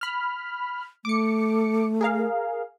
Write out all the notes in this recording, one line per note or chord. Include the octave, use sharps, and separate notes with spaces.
B5 F6
A3 D6 C#7
G#4 A#4 F5